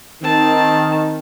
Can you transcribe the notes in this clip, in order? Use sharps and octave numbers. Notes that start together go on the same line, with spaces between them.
D#3 C4 A5